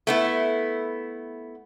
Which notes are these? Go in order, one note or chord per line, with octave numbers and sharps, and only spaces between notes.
A3 B3 E4